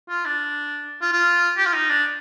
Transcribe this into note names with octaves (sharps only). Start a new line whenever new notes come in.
F4
D4
F4
F4
G4
F4
D#4
D4